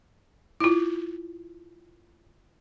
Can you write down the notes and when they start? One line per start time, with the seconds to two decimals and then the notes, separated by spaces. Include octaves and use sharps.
0.60 E4 F4